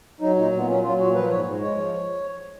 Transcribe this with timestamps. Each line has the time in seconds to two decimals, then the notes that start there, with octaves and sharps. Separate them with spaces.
0.21 F#3 D#4
0.36 A#2 D#4
0.52 A#2
0.58 B3
0.67 F#3 C#4
0.83 F#3 F4
0.99 A#2 F#4
1.14 F3 B4
1.29 G#2 C#5
1.46 G#2
1.61 G#3 C#5
1.76 F3